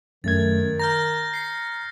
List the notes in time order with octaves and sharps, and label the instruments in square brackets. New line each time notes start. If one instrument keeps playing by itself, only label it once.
[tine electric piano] F#2 A3 G#6 [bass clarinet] D#3 [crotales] A6
[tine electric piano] A#5 [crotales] F6 G6 A#6
[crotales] C7 C#7